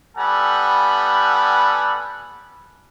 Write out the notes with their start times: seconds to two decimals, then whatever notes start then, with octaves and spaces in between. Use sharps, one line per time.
0.18 G3 B3 A4 F#5 G#5 B5